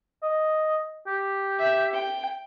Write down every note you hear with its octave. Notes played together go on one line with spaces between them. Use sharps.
D#5
G4
E5
G5